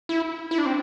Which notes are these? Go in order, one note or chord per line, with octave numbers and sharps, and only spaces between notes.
E4
E4
D4
C4